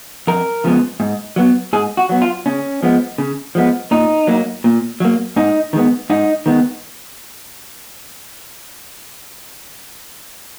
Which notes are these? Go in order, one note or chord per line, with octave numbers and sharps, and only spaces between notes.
F2 A#4
C#3 F3 G#3 B3
G#2
F#3 B3
G#2 G#4
F#4
F#3 B3
F4
C#3 C#4
F3 G#3 B3
C#3
F3 G#3 B3
A#2 D#4
F#3 A#3
A#2
F#3 A#3
G#2 D#4
D#3 G#3 B3
G#2 D#4
D#3 G#3 B3